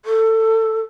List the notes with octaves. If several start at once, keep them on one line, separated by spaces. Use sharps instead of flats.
A4